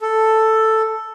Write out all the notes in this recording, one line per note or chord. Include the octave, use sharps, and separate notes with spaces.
A4